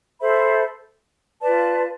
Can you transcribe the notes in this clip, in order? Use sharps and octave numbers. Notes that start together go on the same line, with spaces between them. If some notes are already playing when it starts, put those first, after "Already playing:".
A4 C5 E5 B5
F4 B4 D5 A5